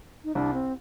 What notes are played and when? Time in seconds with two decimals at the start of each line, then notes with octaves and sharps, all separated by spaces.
0.24 D#4
0.35 C2 D4
0.54 C4